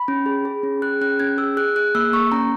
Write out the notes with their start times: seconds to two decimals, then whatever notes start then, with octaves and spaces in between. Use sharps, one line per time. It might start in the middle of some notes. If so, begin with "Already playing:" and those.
Already playing: B5
0.08 C#4
0.26 G#4
0.45 G#4
0.63 C#4
0.82 G#4 F#6
1.01 C#4 F#6
1.20 C#4 G#6
1.38 G#4 E6
1.57 G#4 F#6
1.76 G#4 F#6
1.95 A#3 E6
2.13 A#3 C#6
2.32 C#4 A#5